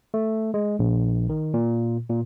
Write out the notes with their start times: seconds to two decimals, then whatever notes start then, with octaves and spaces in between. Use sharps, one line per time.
0.14 A3
0.54 G#3
0.79 A#1
1.29 D#3
1.54 A#2
2.10 A#2